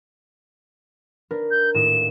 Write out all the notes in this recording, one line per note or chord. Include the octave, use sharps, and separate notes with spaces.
D4 A#4 B4
G6
D#1 A2 D#5 E7